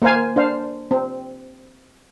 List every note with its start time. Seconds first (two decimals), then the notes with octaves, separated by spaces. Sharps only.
0.02 A#3 A#4 C5 F5 G#5
0.36 D4 C5 F5
0.91 C4